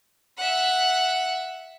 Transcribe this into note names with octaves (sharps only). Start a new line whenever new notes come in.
E5 F#5